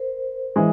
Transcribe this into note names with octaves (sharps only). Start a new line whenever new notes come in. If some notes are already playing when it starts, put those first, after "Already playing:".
Already playing: A#4 C5
E3 G#3